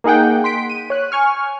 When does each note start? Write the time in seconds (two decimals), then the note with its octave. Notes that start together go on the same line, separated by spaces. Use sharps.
0.04 A#3 D#4 G#4 F#5 G5
0.44 C6 B6 D7
0.70 D#7
0.90 C#5 F#6
1.12 G#5 C#6 F6